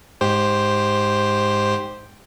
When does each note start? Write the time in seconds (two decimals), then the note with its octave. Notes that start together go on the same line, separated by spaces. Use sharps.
0.21 G#2 G4 C5